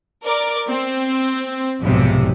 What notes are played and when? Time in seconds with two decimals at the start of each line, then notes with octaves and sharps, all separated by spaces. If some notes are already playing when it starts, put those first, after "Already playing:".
0.24 A#4 D5
0.69 C4
1.81 B1 F2 G#2 C3